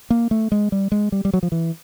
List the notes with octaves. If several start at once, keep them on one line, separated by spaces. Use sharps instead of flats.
A#3
A3
G#3
G3
G#3
G3
G3
F#3
F3
E3